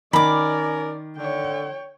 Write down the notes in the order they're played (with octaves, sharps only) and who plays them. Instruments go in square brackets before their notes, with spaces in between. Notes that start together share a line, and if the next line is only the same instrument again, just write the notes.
[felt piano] D#3 [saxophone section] C#4 A#4 [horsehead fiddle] D5 [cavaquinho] B5 D6
[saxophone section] D3 [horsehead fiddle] C#5 G5